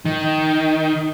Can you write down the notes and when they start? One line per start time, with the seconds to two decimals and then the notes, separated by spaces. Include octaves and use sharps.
0.05 D#3